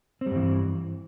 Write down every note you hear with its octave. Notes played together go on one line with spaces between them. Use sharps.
G2 E3 G3 C4